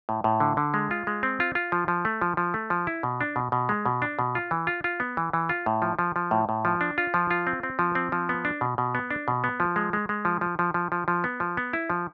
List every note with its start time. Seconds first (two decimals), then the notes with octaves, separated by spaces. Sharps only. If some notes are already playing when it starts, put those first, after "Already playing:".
0.09 A2
0.24 A2
0.40 D3
0.57 D3
0.74 G#3
0.91 F4
1.07 G#3
1.23 C4
1.40 F4
1.55 F4
1.72 F3
1.88 F3
2.05 A3
2.21 F3
2.37 F3
2.54 A3
2.70 F3
2.87 E4
3.03 B2
3.21 D4
3.36 B2
3.52 B2
3.69 G#3
3.86 B2
4.02 D4
4.19 B2
4.35 F4
4.51 E3
4.67 F4
4.84 F4
5.00 B3
5.17 E3
5.33 E3
5.49 F4
5.66 A2
5.82 F3
5.99 F3
6.16 F3
6.31 A2
6.49 A2
6.65 F3
6.81 D4
6.98 F4
7.14 F3
7.31 F4
7.47 C4
7.63 C4
7.79 F3
7.95 C4
8.12 F3
8.29 B3
8.45 D4
8.61 B2
8.78 B2
8.95 B3
9.11 D4
9.28 B2
9.44 B3
9.60 F3
9.76 G#3
9.93 G#3
10.09 G#3
10.25 F3
10.41 F3
10.59 F3
10.74 F3
10.92 F3
11.08 F3
11.24 B3
11.40 F3
11.57 B3
11.73 E4
11.90 F3